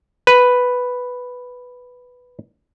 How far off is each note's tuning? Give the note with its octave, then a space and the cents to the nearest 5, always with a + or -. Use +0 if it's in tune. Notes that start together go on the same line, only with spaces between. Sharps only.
B4 +0